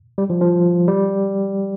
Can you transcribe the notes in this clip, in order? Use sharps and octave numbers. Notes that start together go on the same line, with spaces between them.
G3
F3
F3
G3